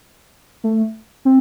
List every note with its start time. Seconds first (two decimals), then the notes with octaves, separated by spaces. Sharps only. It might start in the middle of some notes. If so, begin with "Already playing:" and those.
0.64 A3
1.25 C4